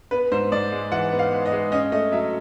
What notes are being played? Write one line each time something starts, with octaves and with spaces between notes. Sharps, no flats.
B3 B4
G#2 C5
G#2 D5
G#3
E3 F#5
B3
F5
G#3
D#5
G#3
C#4 D#5
A3 D#5
F#3 E5